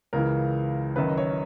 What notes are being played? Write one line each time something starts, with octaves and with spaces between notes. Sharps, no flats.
C#2 C#3 E3 A#4
F#1 F#2 D#3 B4
D#5
C#5